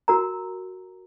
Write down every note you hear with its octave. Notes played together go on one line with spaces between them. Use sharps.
F#4 A#4 A#5